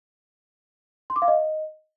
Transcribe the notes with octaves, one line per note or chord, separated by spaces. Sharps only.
C6
D6
F5
D#5